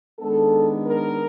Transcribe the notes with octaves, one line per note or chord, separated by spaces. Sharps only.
D#3 G#3 B3 D4 A4
A#4